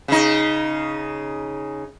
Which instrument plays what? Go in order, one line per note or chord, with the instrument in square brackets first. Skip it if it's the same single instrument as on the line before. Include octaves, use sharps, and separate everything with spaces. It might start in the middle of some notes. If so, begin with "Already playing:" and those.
[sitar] C#3 D#4